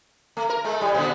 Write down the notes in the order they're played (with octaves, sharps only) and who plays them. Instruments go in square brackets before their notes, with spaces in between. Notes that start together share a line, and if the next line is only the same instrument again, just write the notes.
[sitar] A3
A#4
G#3 A3
A2 G3
A#2 D3